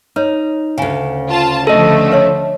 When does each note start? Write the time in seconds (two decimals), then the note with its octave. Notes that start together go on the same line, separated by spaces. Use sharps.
0.16 D#4 B4 C#5
0.78 D2 C#3 G5 G#5
1.29 F4 A5
1.67 D3 F3 A3 A4 D#5
2.12 B4 C#5 E5